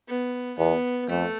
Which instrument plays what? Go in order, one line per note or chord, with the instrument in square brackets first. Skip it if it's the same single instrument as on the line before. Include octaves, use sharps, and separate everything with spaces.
[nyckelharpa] B3
[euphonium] E2 [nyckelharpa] B3
[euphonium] F2 [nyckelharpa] A3